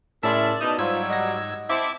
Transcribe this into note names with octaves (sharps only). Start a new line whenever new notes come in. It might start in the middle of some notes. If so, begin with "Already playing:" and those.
A2 C#3 E4 A#4 D5 E5 A5 C6
B2 D#4 D#6
G#2 F#3 G3 F4 C5 F5 E6 G#6
D#5 F#5 A#6
C4 E4 E5 A5 D6